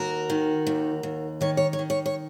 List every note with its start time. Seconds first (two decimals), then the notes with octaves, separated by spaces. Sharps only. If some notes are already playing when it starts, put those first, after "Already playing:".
Already playing: D#2 F#4 A#4
0.30 D#3
0.67 D#2
1.03 D#2
1.41 D#3 C#5
1.57 C#5
1.73 C#5
1.79 D#3
1.90 C#5
2.06 C#5